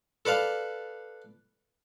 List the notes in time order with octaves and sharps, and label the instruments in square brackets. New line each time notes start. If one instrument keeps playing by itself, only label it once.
[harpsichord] A4 B4 D5 F5